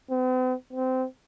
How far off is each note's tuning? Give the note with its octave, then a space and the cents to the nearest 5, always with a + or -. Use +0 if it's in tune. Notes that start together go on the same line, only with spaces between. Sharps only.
C4 -45
C4 -20